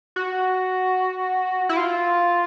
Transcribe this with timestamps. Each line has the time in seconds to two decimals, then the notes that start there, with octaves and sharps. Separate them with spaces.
0.16 F#4
1.69 E4
1.77 F4